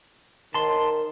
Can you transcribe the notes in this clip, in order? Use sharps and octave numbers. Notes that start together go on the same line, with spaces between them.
D#3 A5 C6